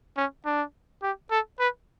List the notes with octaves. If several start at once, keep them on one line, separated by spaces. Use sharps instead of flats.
C#4
D4
G4
A4
B4